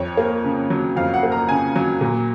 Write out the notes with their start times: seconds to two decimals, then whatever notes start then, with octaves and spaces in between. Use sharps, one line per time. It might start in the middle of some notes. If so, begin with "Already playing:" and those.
Already playing: F2 C#5
0.17 A#3
0.44 C#3
0.70 F#3
0.96 F2 F5
1.14 F#5
1.23 A#3
1.32 A#5
1.49 C#3 G#5
1.76 F#3
2.01 A#2